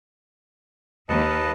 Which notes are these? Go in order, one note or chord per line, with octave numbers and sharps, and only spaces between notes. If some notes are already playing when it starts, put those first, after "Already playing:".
D#2 B4 D#5 A5